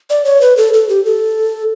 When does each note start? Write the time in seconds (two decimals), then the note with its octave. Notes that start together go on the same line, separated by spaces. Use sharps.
0.10 D5
0.25 C#5
0.41 B4
0.57 A4
0.74 A4
0.89 G4
1.05 A4